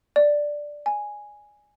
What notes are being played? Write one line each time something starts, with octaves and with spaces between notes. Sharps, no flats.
D5
G#5